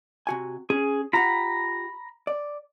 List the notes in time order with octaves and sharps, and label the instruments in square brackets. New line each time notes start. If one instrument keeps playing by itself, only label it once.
[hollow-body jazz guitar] C3 F#4 G#5
[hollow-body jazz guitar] C#4 [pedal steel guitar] G#4
[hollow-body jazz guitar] F4 G4 F#5 [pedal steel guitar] A#5 B5
[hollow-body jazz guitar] D5